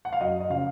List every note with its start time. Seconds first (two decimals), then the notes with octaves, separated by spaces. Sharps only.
0.05 F#5
0.13 F5
0.21 F#2 D#5
0.40 D#5
0.50 C#3 F3 F5